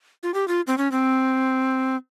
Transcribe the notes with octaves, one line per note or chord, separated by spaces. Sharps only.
F4
G4
F4
C4
C#4
C4